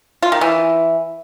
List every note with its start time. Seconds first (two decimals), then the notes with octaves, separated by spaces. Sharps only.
0.23 F4
0.32 D#3
0.41 E3